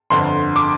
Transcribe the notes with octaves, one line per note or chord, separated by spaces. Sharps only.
G1 F2 D3 C6
D6